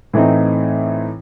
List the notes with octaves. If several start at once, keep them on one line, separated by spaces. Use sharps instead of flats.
A2 E3 A3 C4 D#4